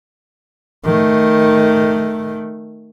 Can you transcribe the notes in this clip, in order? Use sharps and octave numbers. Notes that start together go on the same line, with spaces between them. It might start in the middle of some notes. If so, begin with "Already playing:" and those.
D#3 A3